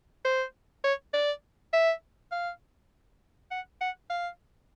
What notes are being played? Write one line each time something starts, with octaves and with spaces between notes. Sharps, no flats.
C5
C#5
D5
E5
F5
F#5
F#5
F5